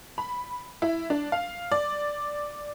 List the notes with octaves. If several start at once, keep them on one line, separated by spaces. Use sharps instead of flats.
B5
E4
D4
F5
D5